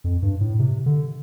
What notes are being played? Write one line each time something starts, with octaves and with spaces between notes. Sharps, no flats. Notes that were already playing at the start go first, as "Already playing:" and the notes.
F2
G2
A2
C3
D3